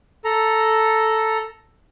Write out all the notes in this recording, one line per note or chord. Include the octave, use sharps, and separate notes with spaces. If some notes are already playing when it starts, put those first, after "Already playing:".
A4 A#5